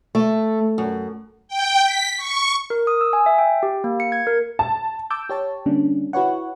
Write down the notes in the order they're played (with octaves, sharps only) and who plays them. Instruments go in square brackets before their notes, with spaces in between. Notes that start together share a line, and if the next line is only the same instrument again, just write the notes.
[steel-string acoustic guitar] A3
F#2
[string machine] G5
B6
C#6
[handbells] A#4
D#6
E6
G#5
E5
G5
G4
A#3
C#7
G#6
A#4
[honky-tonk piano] A5
[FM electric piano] A5 D6 E6 G6
G4 C#5 A5
D3 G3 A#3 C#4 D4
E4 F#4 B4 C#5 F#5